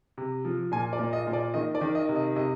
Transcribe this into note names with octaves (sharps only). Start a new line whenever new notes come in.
C3
F3
A#2 G#5
D5
A#2
D#5
A#2
D5
D#3 D#5
D5
D#3
D#5
C3
D#5
C3 D#5